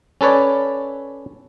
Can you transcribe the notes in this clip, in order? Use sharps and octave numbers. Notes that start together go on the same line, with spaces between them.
C#4 A4 B4 C#5 D5